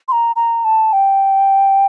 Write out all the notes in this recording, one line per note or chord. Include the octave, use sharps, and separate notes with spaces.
C6
A#5
A#5
A5
G5